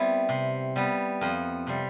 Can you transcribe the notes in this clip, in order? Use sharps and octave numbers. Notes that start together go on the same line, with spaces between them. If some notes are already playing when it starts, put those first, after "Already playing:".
Already playing: G3 B3 C4 E4
C3
G3 B3
F2
C3 G3